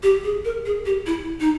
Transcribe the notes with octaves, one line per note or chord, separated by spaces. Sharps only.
G4
G#4
A#4
G#4
G4
E4
D#4